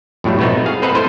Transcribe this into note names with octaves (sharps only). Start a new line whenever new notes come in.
F2 A2 F#3 G3 A3
B2 F#3 A3 B3 C4 D#4
G#4 F5
C4 A4 B4 D#5 F5 F#5
A3 E4 A4 C5